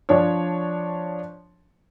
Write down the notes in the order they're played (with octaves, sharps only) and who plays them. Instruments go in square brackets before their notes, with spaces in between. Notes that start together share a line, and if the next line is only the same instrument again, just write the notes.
[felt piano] F3 D4 C#5